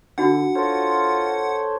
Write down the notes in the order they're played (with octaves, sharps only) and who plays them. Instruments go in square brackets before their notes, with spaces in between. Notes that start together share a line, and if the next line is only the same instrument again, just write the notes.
[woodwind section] D3 [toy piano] D4 D#4 F#4 [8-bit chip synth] F#5
[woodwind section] F4 A#4 [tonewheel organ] A4 C5 C#5